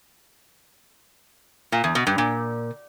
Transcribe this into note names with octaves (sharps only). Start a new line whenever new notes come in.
A#2
E2
B2
G2
A#2